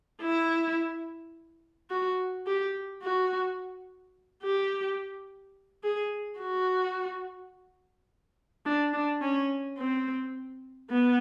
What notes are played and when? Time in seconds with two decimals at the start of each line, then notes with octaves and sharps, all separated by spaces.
0.21 E4
1.90 F#4
2.46 G4
3.02 F#4
4.43 G4
5.83 G#4
6.40 F#4
8.66 D4
8.93 D4
9.21 C#4
9.78 C4
10.90 B3